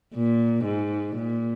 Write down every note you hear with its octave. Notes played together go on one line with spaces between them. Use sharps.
A#2
G#2
A#2